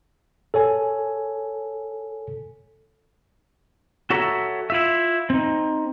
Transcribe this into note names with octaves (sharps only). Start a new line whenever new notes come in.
A4 C#5 G#5
F#4 A4 C#5 E5 A#5
E4 F4 E5
C4 D#4